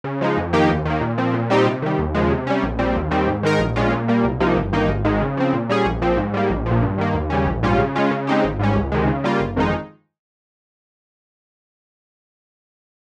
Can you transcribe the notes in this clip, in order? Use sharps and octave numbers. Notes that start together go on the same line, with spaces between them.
C#3
F3 G#3 D#4
F2
D#3 A#3 D#4 G4
D#2
D#3 A#3
A#2
F3 C4
A#2
G3 C4 D#4 G4
C3
D#3 G3
D#2
C#3 F3 G#3
C3
G3 C#4
A#1
A#2 G3 C4
D#2
D#3 G3 C4
G#2
D#3 G#3 D#4 A#4
A#1
A#2 G#3 C#4 F4
A#2
G3 A#3
C2
C3 F3 A#3 D#4
G1
G2 D#3 A#3 D#4
G#1
G#2 D#3 G#3
C#3
F3 C4
A#2
G3 C#4 G#4
A#1
A#2 F3 C4
G#2
G3 A#3
A#1
A#2 F3
G2
D#3 A#3
D#2
C#3 G3 C#4
A#1
G#2 G3 C#4 F4
C#3
G#3 C#4 F4
C#3
G#3 C4 D#4 G4
G#1
G#2 G3 C#4
C#2
C3 D#3 G#3
C#3
G3 A#3 F4
G1
F2 D#3 G#3 D#4